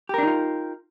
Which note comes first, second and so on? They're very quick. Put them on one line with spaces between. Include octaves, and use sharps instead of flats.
G4 A#4 D4 D#4 F4